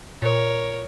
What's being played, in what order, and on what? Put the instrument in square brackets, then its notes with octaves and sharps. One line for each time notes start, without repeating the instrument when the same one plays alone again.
[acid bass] A#2 [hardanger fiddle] A#4 C#5